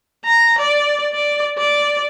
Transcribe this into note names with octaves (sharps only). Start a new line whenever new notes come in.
A#5
D5
D5
D5